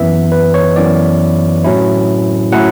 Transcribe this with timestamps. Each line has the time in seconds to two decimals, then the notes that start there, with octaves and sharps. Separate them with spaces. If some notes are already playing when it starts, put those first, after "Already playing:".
Already playing: F#2 E3 B3 E5
0.32 B4
0.54 C#5
0.76 F#2 E3 B3 D5
1.64 A2 F#3 C#4 E4
2.52 A2 F#3 C#4 E4 F#5